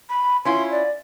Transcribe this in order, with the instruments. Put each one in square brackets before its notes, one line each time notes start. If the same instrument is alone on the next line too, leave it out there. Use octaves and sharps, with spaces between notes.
[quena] B5
[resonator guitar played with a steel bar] C#4 E4 F4 [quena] C6
[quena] D5